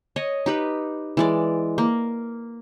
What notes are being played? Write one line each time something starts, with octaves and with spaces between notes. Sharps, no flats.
C#5 D#5
D#4 G4 B4
E3 G#3 D5
A#3